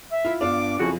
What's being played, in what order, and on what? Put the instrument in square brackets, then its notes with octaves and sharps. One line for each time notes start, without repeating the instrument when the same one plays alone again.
[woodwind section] E5
[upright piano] E4 F4
[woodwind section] G2 B3 D6 [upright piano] D4 F4
[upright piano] F#1 F2 [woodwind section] C#4 E4 F#4